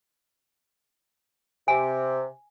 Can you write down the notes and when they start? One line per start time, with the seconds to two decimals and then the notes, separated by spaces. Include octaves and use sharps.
1.68 C3 G#5